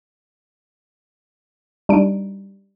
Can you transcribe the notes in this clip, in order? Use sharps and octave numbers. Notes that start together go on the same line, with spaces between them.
G3 D4 D#4 D7